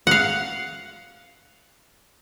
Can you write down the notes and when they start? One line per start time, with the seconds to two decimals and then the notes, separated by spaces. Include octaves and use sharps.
0.07 F5 F#5